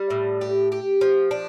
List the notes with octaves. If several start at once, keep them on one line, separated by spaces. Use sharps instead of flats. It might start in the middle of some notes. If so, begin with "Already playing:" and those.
Already playing: G3
A2
G4
G4
F3
D4